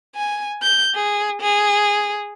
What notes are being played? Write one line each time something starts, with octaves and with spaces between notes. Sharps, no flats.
G#5
G6
G#4
G#4